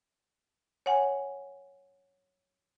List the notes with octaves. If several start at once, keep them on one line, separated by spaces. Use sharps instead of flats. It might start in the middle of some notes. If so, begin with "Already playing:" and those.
C#5 F#5 G#5